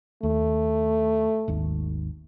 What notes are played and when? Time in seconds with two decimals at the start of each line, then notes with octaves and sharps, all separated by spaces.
0.23 D#2 A3
1.48 G#1 D#2